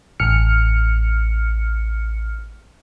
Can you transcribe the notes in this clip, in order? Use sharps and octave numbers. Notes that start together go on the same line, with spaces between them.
A1 F6 C#7